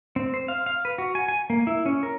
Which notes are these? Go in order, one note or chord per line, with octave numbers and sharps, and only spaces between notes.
C4
C5
F5
F5
B4
F#4
G#5
G#5
A#3
E4
C#4
A#4